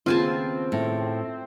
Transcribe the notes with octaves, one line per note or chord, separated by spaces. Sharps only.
D#2 C#3 B3 C4 F4 G#5 A5
A2